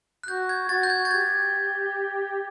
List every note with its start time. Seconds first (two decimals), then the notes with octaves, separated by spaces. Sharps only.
0.24 F#6
0.28 F#4 G6
0.49 G#6
0.69 F#4 A6
0.83 G6
0.90 G#6
1.05 A6
1.11 G4 G#6